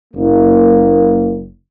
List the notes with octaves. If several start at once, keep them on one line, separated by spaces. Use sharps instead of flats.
F#1 A#3